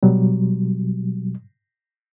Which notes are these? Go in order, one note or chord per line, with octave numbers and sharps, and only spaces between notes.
B2 F#3 G3